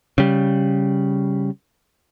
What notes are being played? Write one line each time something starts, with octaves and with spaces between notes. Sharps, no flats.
C#3 G3